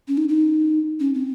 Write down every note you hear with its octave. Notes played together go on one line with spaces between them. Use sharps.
C#4
D#4
D#4
C#4
C4